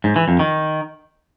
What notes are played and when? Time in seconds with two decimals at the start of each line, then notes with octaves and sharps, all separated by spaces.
0.04 G#2
0.16 E3
0.28 F2
0.39 D#3